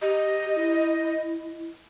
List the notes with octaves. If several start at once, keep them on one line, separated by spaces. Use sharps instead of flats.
G4 D#5
E4